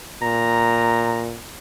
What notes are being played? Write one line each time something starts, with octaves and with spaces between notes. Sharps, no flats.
A#2 A#5